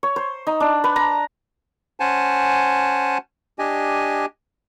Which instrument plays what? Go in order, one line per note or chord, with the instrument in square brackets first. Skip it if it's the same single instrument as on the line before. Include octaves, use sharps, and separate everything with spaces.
[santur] C#5
C5
D#4
D4
B4
A#5
[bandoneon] C#4 C5 F#5 G#5 A5
D4 G4 D#5 G#5